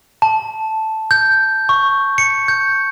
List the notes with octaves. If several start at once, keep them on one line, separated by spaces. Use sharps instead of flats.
A5
G6
C#6
C#7
G6